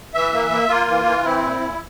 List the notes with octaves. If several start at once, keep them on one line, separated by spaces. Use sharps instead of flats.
E3 E5
A#3
A#3
A#3 F4
E3
E3
C4 E4
A#2
A#2